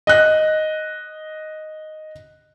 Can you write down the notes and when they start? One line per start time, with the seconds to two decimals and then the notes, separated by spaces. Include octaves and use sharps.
0.07 D#5 F#6